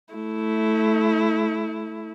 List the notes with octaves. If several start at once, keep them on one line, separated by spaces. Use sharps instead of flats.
A3 E4